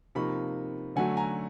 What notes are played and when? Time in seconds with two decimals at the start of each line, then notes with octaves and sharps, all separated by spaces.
0.15 C3 F3 A#3 D#4 B5 C#6
0.96 D3 F#3 A3 F#5 G#5
1.17 G#5 A#5